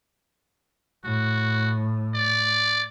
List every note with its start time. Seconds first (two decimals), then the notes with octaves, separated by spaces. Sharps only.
1.04 A2 F#4
2.15 D5